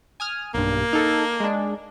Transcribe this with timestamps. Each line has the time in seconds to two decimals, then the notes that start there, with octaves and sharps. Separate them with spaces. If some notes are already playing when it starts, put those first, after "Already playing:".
0.20 G#5 D#6 F6
0.54 B1 G2 A#3
0.93 D#4 A4
1.40 G#3 D4